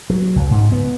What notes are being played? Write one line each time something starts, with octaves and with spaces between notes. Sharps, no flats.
F#3
C#2
G#2
B3